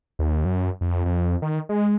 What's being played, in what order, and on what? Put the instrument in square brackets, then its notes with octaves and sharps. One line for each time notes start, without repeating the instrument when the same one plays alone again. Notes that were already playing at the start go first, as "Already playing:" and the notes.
[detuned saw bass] D#2
F#2
F2
F2
D#3
G#3